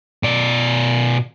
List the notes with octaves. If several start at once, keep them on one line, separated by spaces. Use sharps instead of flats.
B2 D5